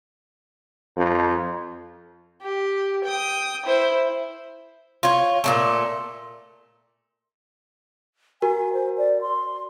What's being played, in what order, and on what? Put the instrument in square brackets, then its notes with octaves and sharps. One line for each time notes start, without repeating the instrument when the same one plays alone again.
[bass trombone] F2
[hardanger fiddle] G4
G5 D#6
E4 C5
[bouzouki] F4 C#5
A#2 C#3 A3
[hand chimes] F#4 A#4 [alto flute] G#5
[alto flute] C5
D5
C6